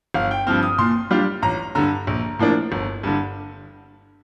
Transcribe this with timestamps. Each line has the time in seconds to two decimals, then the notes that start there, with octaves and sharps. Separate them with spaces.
0.14 G1 F5
0.31 G5
0.47 G2 F3 C4 F6
0.63 D#6
0.78 A#2 C6
1.11 G3 D4 F4
1.42 A1 A#5
1.75 G2 D3 A#5
2.07 A#1
2.39 A2 F3 A#3 D4
2.72 G1
3.03 G2 D3